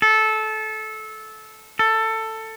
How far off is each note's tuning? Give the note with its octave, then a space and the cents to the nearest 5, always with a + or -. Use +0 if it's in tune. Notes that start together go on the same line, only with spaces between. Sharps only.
A4 -20
A4 +15